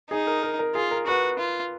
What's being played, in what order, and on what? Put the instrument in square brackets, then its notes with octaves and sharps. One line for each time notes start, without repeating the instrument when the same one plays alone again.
[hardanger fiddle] D#4 [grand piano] G#4
[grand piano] A#4
A#4
A#4
[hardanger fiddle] F4 [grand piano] G#4
[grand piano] A#4
[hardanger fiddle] F#4 [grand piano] B4
[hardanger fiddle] F4